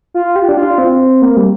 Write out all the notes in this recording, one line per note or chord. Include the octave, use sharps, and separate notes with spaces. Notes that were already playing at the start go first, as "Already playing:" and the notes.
F4
G4
D4
F4
C4
A#3
G3